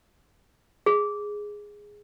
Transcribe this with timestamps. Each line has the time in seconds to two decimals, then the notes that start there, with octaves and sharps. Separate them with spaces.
0.86 G#4